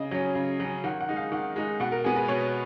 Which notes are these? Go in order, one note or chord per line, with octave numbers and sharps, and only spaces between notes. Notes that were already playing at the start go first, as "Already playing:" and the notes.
Already playing: C#3 D#5
F#3 C#4
C#3
F#3 C#4
D#3 F#5
F#5
G#3 D#4
F5
D#3 F#5
G#3 D#4
B2 F#5
A#4
G#3 B3 G#4
B4
B2 C#5